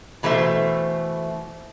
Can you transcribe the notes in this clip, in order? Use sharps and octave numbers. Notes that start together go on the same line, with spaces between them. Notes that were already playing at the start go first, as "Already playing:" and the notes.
B2 E3 A3 C5 E5